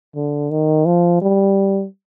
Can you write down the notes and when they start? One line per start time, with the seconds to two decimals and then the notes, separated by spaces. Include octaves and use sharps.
0.15 D3
0.51 D#3
0.86 F3
1.21 G3